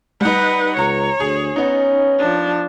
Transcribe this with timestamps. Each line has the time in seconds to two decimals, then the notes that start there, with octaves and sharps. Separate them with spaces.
0.21 G3 D#4 B4 F#5
0.77 C#2 C#5 A#5 C#7
1.20 D2 G#4
1.56 B3 C#4 D#4
2.19 F3 D4